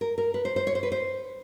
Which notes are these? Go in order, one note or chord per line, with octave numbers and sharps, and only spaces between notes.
A#4
A#4
B4
C5
C5
C#5
C5
B4
C5